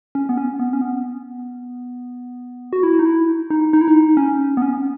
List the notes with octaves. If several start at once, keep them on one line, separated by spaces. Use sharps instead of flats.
C#4
B3
C#4
B3
C#4
B3
F#4
E4
D#4
E4
D#4
D#4
E4
D#4
C#4
B3
C#4